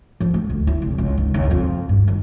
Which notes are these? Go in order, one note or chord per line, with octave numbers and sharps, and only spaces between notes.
F3
A3
D2
E4
F1
C#2
D#3
D#2
F2
G2
D#3